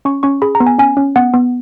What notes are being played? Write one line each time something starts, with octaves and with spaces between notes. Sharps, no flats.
C#4 C#6
C#4 C#6
G#4 B5
A#5
B3
G#5
C#4 G#5
C#4
B3 F#5
B3